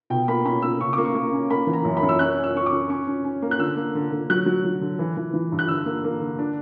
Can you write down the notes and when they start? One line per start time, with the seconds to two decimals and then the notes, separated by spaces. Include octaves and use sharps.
0.10 B2 G5
0.28 A#3 B5
0.45 C#4 B5
0.62 A#3 E6
0.80 C#3 C#6
0.93 A#3 D6
1.05 C#6
1.15 A#3
1.33 C#4
1.50 A#3 B5
1.67 E3
1.73 A#5
1.85 F#2
1.97 B5
2.03 F#2
2.09 E6
2.19 C#4 F#6
2.38 C#4
2.44 E6
2.55 C#4 C#6
2.66 D6
2.72 C#4
2.90 C#4 C#6
3.07 C#4
3.25 C#4
3.42 A#3
3.51 F#6
3.59 D3 E6
3.76 A#3
3.95 D3
4.12 D3
4.30 F#3 F#6
4.46 F#3
4.65 F#3
4.81 D3
4.99 E3
5.17 E3
5.34 E3
5.52 G2
5.59 F#6
5.68 D3 E6
5.86 A#3
6.04 A#3
6.22 D3
6.39 D4